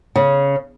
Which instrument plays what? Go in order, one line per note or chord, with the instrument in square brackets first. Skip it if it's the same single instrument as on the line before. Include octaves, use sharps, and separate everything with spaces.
[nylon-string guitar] C#3